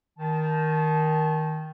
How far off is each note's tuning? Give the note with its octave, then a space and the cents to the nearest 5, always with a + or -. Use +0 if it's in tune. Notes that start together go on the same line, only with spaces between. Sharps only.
D#3 +5 A5 -25